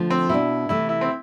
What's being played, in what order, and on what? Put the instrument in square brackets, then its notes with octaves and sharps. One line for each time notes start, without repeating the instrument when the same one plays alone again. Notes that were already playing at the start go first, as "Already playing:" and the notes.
Already playing: [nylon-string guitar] D3 F3 A3
[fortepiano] C4
[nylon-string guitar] B2 B3 D4 [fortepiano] E4
[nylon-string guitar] C3 E3 A3 [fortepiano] E4
[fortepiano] E4
C4